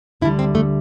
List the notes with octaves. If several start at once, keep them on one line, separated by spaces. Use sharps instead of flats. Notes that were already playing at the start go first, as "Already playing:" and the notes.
D2 D3 G3 E4
C4
A3